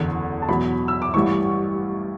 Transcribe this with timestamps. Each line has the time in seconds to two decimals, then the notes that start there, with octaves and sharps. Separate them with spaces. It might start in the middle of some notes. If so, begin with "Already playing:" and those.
Already playing: F#1 E2 D3
0.42 A5
0.48 E2 B2 F#3 B5
0.88 E6
1.02 D6
1.14 A1 G2 E3 C#6